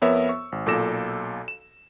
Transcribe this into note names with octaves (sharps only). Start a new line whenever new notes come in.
F2 B3 A#4 C#5 E5 E6
C#6
G#1
B1 A#2 A4 D6 A#6 E7
E7